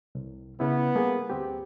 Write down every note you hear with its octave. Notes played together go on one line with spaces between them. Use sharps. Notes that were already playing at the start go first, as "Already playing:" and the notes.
C2
C#3 B3 C#4 E4
G3 A#3 G#4
D2 C4 G4